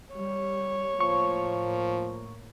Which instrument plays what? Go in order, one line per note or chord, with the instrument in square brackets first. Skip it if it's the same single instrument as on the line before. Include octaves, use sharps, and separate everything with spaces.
[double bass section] G3 [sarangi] C#5
[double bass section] A2 A#3 [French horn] F3 [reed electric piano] C#6